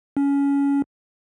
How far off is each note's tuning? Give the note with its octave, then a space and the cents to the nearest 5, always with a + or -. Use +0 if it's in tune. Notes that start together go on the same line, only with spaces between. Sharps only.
C#4 +20